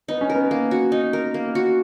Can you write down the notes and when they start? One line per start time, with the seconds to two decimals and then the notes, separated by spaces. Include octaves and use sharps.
0.08 B3 D#4
0.21 C#4
0.30 A#4
0.35 B3
0.51 A#3
0.71 F#4
0.92 D#4
1.13 A#4
1.34 A#3
1.55 F#4